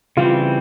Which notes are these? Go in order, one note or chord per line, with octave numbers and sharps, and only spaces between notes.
C#3 E3 G3 C4 F4